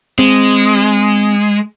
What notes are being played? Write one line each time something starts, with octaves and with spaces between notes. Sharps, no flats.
G#3 C4